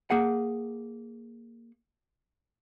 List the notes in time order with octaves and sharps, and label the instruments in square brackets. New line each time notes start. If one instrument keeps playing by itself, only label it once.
[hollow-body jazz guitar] A#3 G#4 F#5